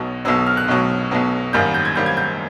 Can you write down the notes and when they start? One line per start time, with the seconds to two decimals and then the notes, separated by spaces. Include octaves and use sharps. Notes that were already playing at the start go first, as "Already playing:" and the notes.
Already playing: B1 B2 F#3 D#6
0.25 B1 B2 F#3 E6
0.46 F6
0.57 F#6
0.68 B1 B2 F#3
1.11 B1 B2 F#3
1.53 G#1 F#2 D#3 G3 A#3 G6
1.74 G6
1.85 G#6
1.95 G#1 F#2 D#3 G3 A#3 G6
2.06 G#6
2.17 G6